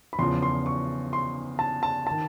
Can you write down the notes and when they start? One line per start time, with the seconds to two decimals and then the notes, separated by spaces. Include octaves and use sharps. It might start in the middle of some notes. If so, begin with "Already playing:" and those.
0.13 B5
0.19 E2 C#3 F3 C6
0.43 C6
0.66 C#6
1.13 C6
1.59 A5
1.83 A5
2.07 D#3 A5